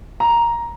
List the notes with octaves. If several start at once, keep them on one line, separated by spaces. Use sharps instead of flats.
A#5